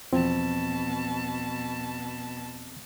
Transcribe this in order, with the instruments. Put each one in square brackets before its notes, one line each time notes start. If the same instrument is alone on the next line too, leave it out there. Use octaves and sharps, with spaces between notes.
[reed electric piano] E2 F3 C4 [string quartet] B2 A5